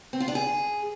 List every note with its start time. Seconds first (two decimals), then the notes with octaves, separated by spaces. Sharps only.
0.13 C4
0.20 F4
0.28 D4
0.35 G#4